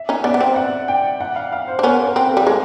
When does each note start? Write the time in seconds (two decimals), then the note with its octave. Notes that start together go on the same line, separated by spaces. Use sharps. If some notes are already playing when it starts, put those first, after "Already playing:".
Already playing: E5
0.09 C#4 D#4
0.24 B3 D5
0.34 B3
0.41 C4
0.56 F#5
0.88 G5
1.21 F#5
1.36 F5
1.52 F5
1.68 C5
1.79 D4
1.83 B3 C#4 A#4
2.06 A#4
2.16 C4 B4
2.31 A4
2.37 G3 G#4
2.47 G#3 A4